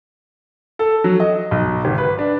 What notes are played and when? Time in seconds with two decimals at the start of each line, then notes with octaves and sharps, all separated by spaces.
0.79 A4
1.04 F#3
1.20 D#5
1.51 B1
1.85 G#1
1.98 B4
2.19 D4